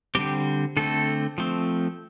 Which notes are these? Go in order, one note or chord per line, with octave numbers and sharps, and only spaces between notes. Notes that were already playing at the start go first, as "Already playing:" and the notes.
D3 G3 C4 G4
D3 A3 C4 A4
F3 A3 C4